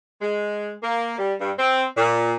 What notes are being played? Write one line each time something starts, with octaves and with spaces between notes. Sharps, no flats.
G#3
A#3
G3
G2
C4
A#2